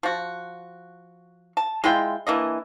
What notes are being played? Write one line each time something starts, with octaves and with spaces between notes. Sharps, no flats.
F3 F#4
A5
G#3 E4 F4 G5
E3 A#3 D4 D#5